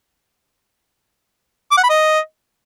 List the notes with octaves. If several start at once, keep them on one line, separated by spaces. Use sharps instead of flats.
D6
F#5
B5
D#5